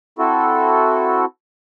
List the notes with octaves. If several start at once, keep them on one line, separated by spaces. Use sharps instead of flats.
C4 E4 F#4 A4